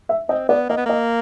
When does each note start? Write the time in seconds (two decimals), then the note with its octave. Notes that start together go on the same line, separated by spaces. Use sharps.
0.09 E5
0.29 C4 D#5
0.49 B3 D5
0.69 A#3 D#5
0.77 B3
0.86 A#3 D#5